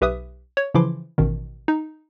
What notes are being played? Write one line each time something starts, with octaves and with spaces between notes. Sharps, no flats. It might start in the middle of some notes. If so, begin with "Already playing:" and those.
B1 G4 B4 E5 D#6
C#5
C#3 E3 F3 E4 C6 D6
A1 B2 D#3
D#4